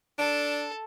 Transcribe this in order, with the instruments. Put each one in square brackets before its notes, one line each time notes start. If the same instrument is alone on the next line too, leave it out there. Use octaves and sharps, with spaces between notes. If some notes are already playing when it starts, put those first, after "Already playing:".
[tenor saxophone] D4 [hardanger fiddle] A4 [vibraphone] A5